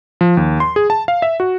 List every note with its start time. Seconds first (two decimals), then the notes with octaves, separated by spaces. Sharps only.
0.21 F3
0.37 D#2
0.60 C6
0.76 G#4
0.90 A5
1.08 F5
1.22 E5
1.40 F#4